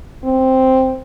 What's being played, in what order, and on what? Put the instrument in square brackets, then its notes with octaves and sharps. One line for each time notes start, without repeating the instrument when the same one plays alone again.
[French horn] C4